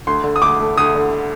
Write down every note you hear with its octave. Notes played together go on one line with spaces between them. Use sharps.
D2 C6
D3
D#6
D2 D6
A3
D2 D#6
D3